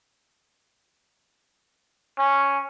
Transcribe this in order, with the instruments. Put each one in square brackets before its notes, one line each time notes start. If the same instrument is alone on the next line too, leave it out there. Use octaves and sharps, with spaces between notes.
[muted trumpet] C#4